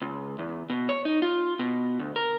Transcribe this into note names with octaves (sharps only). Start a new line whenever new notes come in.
C#2
E2
B2
C#5
D#4
F4
B2
D2
A#4